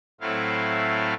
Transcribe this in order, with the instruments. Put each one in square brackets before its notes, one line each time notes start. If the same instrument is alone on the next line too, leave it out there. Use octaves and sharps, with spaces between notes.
[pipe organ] A2 F#3 A3 C4 E4 F5